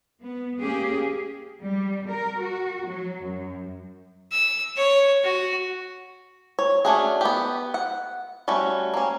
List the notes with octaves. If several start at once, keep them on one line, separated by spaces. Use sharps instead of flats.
B3
A#3 C#4 G4 G#4
G3
A#4
F#4
F#3
F#2
E6
C#5
F#4
C#5
A3 C#4 D4 F#4 G#4
B3 G4
F#5
G3 A3 C#4 F#4
A#3 C#4